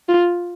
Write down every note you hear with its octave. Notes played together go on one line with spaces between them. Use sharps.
F4